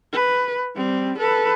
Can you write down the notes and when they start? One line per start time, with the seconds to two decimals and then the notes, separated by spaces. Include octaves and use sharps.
0.13 B4
0.76 G3 C4
1.19 A4 B4